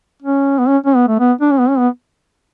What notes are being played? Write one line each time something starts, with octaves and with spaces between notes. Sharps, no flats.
C#4
B3
C#4
C#4
B3
A3
B3
D4
C#4
B3
C#4
B3